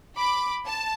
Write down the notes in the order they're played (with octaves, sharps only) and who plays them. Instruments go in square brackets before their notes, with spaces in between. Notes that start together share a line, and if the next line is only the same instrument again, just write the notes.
[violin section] B5 D6
A5